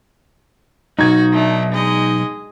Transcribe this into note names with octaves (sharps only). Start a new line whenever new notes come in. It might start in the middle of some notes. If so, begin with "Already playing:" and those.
B1 G2 D#4 F#4 G#6
A3 D4
G#3 D#5